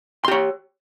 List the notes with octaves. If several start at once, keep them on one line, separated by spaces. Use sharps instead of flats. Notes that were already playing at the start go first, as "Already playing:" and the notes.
G4 C#5 C6